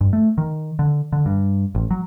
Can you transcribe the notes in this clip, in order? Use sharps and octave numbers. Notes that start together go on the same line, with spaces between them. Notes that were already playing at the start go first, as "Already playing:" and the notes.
G2
A3
D#3
D3
D3
G2
A1
F#3